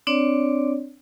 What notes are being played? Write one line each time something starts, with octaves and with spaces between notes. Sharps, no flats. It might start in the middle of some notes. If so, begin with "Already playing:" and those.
C4 D4 C#5 D5